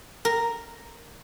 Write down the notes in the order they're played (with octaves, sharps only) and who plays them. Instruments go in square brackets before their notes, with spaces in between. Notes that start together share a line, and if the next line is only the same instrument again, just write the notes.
[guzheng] A#4